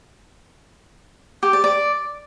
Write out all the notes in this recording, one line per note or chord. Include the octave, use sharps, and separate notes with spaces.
G4
D5
D5